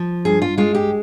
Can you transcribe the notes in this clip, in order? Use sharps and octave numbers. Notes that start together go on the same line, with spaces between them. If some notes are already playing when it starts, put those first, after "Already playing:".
Already playing: F3
G2 G#4
F4
G#3 F4
G4